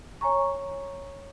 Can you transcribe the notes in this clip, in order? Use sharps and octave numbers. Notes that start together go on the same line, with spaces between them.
C#5 G#5 A#5 C#6